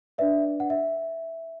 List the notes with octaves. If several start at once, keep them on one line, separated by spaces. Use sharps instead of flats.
D4 B4 D5 E5
F#5
E5